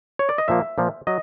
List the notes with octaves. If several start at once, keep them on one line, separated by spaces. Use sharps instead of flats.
C#5
D5
D#5
A#2 F3 A#3 E5
A#2 F3 A#3
F#3 D#5